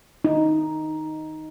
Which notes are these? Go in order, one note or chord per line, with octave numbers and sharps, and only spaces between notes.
D#4